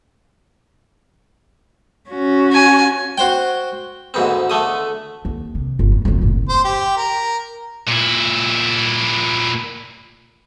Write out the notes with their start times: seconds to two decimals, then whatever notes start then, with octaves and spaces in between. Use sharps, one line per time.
2.10 C#4 F#4
2.53 G#5
3.18 F#4 C5 G5
4.14 D2 G#2 B3 C4
4.50 D3 A3 D#6
5.25 D#2
5.55 C3
5.79 G1 F3
5.92 F#2
6.05 F#1 F2
6.22 F#1 A2
6.49 C5
6.64 G4
6.97 A#4
7.88 A#2 E4